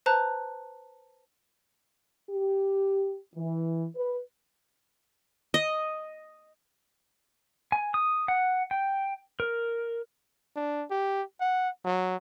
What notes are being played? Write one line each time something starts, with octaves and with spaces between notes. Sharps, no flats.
B4 C5 A5 A#5 F#6
G4
E3
B4
D#5
G#5
D#6
F#5
G5
A#4
D4
G4
F#5
F#3